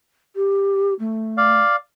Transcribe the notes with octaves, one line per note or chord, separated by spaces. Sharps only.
G4
A3
D5 F5